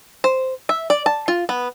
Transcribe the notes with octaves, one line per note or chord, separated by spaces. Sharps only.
C5
E5
D5
A5
F4
B3